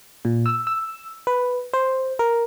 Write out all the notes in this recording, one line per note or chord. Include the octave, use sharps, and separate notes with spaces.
A#2
E6
E6
B4
C5
A#4